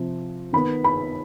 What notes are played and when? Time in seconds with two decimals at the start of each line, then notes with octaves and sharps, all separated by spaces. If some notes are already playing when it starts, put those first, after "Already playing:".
Already playing: C3 F3 C4
0.53 D#3 B3 B5
0.84 B5